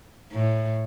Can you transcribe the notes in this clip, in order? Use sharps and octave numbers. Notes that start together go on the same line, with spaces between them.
A2